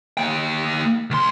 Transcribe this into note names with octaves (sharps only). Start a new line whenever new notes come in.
A#3 G5
C#2 C6